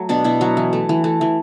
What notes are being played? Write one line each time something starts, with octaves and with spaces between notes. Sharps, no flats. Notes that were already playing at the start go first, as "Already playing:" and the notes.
Already playing: F#3 A3
B2 D4
B2 E4
F#3 F#4
E3
A3
E3
A3
E3